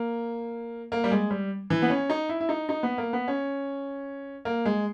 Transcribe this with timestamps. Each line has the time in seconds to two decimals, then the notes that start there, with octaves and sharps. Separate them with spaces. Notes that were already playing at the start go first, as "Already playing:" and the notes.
Already playing: A#3
0.92 A#3
1.04 G3
1.11 G#3
1.31 G3
1.70 E3
1.82 B3
1.90 C#4
2.10 D#4
2.29 E4
2.41 E4
2.49 D#4
2.69 D#4
2.83 B3
2.98 A#3
3.13 B3
3.28 C#4
4.45 A#3
4.65 G#3